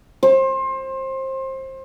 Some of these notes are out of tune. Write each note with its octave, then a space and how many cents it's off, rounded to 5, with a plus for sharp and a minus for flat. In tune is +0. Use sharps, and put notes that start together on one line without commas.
C5 +25